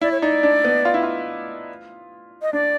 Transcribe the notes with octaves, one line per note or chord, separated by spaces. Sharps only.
E4 D5
C#5
D#4 D5
D4
B3
F4
E4
F4
D#5
D4 D5